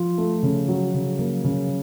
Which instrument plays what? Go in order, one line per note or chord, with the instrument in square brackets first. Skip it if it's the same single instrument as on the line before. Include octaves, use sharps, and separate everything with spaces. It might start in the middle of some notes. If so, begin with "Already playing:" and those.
Already playing: [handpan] F3 [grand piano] F4
[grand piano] A3
C#3
F#3
C#3
[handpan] F#3 [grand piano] A#3
[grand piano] C#3